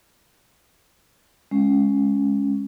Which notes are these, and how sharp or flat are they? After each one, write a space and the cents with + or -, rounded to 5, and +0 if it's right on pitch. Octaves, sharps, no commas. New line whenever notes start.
G#3 +0 C#4 +0